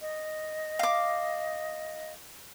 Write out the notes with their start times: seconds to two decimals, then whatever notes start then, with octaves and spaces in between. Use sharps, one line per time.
0.01 D#5
0.79 F5 D6